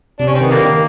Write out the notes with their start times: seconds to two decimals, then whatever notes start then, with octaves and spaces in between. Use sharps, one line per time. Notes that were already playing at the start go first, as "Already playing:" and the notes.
0.19 C3 D4
0.27 C#4
0.35 C4
0.40 D#3 B3
0.51 D3 G3 A#3
0.61 D#3